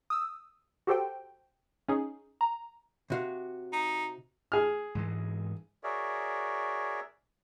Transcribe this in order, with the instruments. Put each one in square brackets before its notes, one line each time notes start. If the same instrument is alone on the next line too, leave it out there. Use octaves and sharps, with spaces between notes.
[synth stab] D#6 E6
F#4 G4 A4 C5 G5
C#4 D#4 G#4
A#5
[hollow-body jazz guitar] C3 F#4 F5
[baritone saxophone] D#4
[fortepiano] G#4 F6
[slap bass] G#2 E3 G#3
[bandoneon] F#4 G#4 A#4 C#5 D5 E5